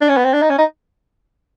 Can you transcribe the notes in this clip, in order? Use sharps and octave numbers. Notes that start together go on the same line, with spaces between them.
D4
C#4
B3
C4
D4
D#4
C#4
D#4